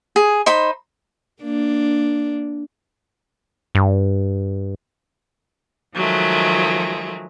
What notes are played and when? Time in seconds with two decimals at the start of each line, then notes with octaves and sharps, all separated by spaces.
0.16 G#4
0.46 D#4 C5 B5
1.42 A#3 D4
3.75 G2
5.95 D#3 F3 F#3 G#3 A3